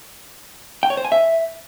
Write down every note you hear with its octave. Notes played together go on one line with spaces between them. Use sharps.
G5
C#5
C5
G#5
E5